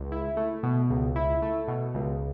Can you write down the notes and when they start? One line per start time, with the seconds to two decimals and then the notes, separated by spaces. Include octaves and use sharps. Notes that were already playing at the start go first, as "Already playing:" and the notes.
Already playing: C#2
0.12 E4
0.37 A3
0.63 B2
0.90 C#2
1.16 E4
1.42 A3
1.68 B2
1.95 C#2